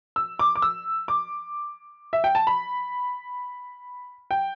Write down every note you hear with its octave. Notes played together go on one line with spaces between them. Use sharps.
E6
D6
D6
E6
D6
E5
G5
A5
B5
G5